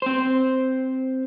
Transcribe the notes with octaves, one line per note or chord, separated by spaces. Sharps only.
C4 C5